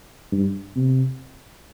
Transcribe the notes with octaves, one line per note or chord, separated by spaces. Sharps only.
G2
C3